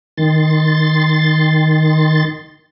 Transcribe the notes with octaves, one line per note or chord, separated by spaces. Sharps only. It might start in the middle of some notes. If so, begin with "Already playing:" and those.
D#3 C6 A6